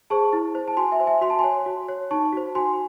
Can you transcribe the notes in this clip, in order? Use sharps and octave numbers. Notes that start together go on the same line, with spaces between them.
G#4 C5 A5 C#6
E4
C5
A5
F#4 G#5 C6
E5 G#5
C5
E5 G#5
F#4 C6
A5
G#5 C6
C#5
F#4
C#5
D#4 A5 C#6
F#4 C5
F#4 G#5 C6